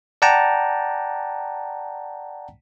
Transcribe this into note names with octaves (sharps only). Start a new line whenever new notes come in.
D5 F#5 G5 A5 A#5